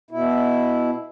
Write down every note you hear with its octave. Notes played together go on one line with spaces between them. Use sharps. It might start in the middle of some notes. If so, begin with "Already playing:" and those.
B2 E4